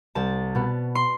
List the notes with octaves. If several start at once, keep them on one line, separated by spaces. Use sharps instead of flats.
C2 A5
B2 B3
C6